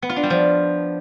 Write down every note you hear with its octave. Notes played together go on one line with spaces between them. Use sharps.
B3
F4
D4
G3
F3